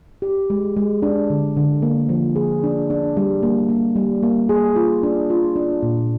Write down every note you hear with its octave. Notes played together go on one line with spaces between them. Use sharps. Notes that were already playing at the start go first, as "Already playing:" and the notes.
G4
G#3
G#3
D4
D3
D3
A#3
F3
G#4
D4
D4
G3
A#3
A#3
G3
A#3
G#4
F4
D4
F4
D4
A#2